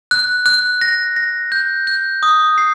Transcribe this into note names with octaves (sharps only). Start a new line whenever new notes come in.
F#6
F#6
A#6
A#6
G6
G6
D#6
C7